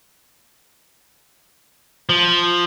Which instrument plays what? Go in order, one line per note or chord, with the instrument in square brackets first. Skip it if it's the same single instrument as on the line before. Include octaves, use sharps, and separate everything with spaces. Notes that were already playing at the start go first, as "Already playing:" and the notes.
[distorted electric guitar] F3